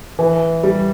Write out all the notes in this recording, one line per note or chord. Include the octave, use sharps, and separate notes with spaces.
E3
G3